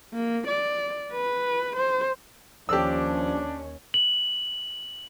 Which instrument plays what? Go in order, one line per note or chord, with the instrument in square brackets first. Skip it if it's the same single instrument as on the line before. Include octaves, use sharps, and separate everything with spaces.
[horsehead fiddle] A#3
D5
B4
C5
[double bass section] D#2 C#4 [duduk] F3 [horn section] D4 [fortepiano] G4 E6
[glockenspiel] F#7